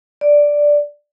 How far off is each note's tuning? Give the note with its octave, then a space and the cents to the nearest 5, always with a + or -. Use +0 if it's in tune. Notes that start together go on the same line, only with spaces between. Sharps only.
D5 +0